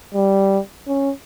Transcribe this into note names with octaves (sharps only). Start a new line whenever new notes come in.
G3
C#4